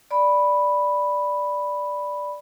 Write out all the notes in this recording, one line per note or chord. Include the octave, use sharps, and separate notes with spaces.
D5 B5